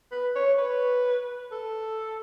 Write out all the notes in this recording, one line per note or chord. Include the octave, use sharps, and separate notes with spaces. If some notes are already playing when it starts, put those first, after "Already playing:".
B4
C#5
B4
A4